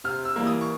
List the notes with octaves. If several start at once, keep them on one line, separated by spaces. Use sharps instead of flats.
C3 F6
E6
E3 G3 A#3
D#6
C#6